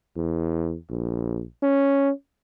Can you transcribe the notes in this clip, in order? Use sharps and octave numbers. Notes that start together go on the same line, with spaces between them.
E2
A#1
C#4